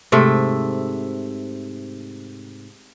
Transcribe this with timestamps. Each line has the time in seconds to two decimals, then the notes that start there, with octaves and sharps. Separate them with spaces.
0.12 G#2 C3 A3